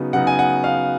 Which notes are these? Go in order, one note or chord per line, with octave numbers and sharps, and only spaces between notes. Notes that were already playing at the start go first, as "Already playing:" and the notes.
Already playing: C#3 F#3 B3 D#4
C#3 F#3 B3 D#4 F#5
G#5
F#5
F5